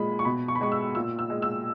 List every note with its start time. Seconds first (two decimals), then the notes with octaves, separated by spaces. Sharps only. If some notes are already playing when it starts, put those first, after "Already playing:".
Already playing: A#2 G#3 B5
0.19 C#6
0.25 B2 B5
0.48 C#6
0.55 B5
0.61 G#3 C#6
0.72 E6
0.95 A#2 E6
1.19 E6
1.30 G#3
1.42 E6